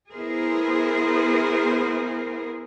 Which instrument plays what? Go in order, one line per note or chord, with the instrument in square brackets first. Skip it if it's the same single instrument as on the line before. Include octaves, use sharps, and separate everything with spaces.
[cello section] B3 E4 G#4 A#4 C5